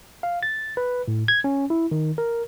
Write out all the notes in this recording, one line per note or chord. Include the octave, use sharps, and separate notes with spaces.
F5
A6
B4
A2
G#6
C#4
E4
D#3
A#4